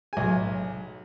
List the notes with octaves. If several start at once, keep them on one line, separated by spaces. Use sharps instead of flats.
B1 G#5